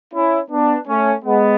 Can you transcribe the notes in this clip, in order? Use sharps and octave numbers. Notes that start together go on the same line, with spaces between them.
C#4 E4
B3 D4
A3 C#4
G#3 B3